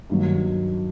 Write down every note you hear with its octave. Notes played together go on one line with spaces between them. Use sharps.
G2 D#3 F#3